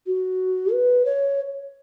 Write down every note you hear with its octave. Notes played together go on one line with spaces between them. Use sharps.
F#4
B4
C#5